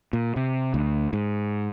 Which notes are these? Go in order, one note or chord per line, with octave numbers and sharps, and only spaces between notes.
A#2
C3
D2
G#2